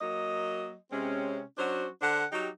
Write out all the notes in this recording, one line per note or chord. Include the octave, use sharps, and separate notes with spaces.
F#3 A#3 D#5
C3 G#3 C4 C#4
F#3 C#4 D4 F#4 C5
D3 D4 C5 F#5
F#3 D#4 G4